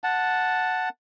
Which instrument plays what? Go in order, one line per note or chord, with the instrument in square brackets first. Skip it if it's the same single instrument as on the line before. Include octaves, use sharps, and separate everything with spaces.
[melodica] F#5 A5